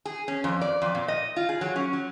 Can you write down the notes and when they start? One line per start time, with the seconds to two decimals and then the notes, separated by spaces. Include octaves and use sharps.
0.05 G#4
0.28 C#4
0.44 F2
0.61 D5
0.82 F2
0.95 A#2
1.08 D#5
1.36 F4
1.49 G#4
1.61 F#3
1.76 C#4
1.93 F#3